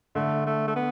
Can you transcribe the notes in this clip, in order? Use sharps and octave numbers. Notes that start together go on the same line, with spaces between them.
D3 A3
A3
A3
B3